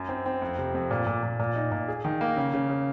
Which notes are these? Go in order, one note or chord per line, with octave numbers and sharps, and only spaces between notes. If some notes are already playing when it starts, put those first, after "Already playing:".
Already playing: F#2
C4
C4
F2
C3
F2
A#2
A#2
A#2
A#2
D#4
A#2
G#4
D#3
A#3
C#3
C#3
C#3